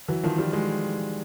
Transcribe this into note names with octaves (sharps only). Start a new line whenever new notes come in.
E3 F#3
D#3 F3
F3 G3
F#3 G#3